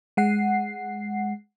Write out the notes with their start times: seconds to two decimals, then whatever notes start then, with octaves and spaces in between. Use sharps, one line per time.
0.17 G#3 F#5 C7